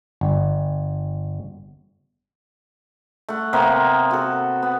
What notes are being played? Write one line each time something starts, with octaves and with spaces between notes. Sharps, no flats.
G1
A3 F#5
C3 A#3 B3
F#4 A4
B3